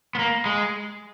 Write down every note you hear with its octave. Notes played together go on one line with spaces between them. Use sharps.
B3
A#3
G#3